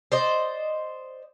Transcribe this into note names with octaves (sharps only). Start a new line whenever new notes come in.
C5 D5 D#5